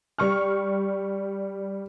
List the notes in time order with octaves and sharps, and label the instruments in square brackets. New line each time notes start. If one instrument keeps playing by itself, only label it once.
[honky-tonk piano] G3 C#6 F6